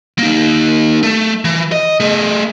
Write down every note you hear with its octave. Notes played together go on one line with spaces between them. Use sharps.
A#3 D#4
A3
E3
D#5
A3 G#4